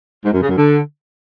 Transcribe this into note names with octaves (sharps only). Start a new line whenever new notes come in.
G#2
F#2
C#3
F#2
D3